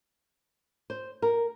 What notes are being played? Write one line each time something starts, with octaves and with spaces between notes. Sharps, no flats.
C5
A#4